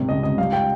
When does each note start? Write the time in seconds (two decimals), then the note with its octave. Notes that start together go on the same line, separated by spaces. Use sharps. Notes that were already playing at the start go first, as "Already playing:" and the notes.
Already playing: G#1 C3 G3
0.09 C#2 D#5
0.23 C#2 D#5
0.38 G3 F5
0.53 G5